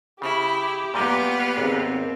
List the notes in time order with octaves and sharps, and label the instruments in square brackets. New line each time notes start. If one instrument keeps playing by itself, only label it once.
[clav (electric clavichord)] C#3 [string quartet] E4 [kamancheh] G4
[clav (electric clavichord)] A#2 G3 D#5 [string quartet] B3 F5
[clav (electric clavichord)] G#1 D#2 [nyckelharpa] C4